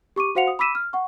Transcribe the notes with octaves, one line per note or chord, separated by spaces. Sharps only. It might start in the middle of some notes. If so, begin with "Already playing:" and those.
G4 C#6 D6 D#7
F#4 C5 F5 F#5 C#7 F7
D#6
B5 D6 E6 B6 D#7 E7
F6
F#5 C#6